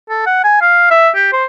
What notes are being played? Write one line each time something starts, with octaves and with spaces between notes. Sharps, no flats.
A4
F#5
G#5
F5
E5
G4
C5